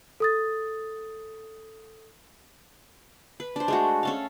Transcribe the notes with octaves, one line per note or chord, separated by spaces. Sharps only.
A4 D#6 A6
B4
D4 C5
G#3 A3 F#4
C#4 A4 F5